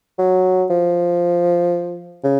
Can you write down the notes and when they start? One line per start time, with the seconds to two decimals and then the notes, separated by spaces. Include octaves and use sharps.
0.19 F#3
0.70 F3
2.24 C#3